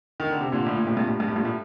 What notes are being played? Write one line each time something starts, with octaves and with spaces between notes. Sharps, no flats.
D#3
D3
C3
A#2 D3
A2
A#2
A2 C3
G2 A#2
A2
G2
A2
G2 A#2
A2